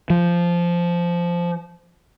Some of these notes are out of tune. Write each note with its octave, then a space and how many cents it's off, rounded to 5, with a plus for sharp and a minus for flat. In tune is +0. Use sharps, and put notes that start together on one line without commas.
F3 -10